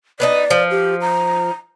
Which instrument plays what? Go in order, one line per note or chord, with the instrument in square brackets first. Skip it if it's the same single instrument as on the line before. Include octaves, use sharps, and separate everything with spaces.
[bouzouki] B3 D4 D#4 [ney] D5
[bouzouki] F3
[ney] G4
A#5